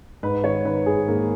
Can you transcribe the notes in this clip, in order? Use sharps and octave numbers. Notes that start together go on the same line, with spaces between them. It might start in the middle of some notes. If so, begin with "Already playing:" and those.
G#2 B4
D#3 C#5
D#3 B4
G#2 G#4
G#2 A#3